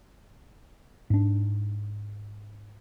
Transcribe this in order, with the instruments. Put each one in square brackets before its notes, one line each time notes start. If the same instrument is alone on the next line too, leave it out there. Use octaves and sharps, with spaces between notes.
[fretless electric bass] G#2 D4